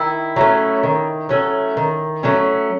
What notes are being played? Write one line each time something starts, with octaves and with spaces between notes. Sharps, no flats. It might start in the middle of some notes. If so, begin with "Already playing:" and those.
Already playing: D#3 E4
F#3 A3 C#4
D#3
F#3 A3 C#4
D#3
F#3 A3 C#4